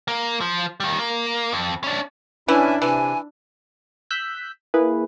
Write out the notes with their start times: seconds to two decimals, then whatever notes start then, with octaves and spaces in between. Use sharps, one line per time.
0.08 A#3
0.41 F3
0.80 D#3 G3
0.99 A#3
1.53 F2
1.84 C#4 D4
2.48 E3 C#4 D4 E4 E5 G#5
2.82 C3 E3 G#5
4.10 E6 F#6 G6 B6
4.74 A#3 E4 G#4 B4